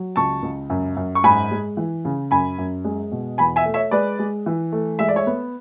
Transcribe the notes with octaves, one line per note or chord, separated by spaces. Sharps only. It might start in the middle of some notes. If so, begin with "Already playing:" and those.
Already playing: F#3
C#2 A5 C#6
C#2
F#2
F#2
C#6
G#2 G#5 B5
G#3
E3
C#3
F#2 G#5 B5
F#2
G#3
B2
E2 G#5 B5
E5 G#5
A3
C#5 E5
G#3 B4 D5
G#3
E3
A3
G#3 E5
D5
C#5 E5
B3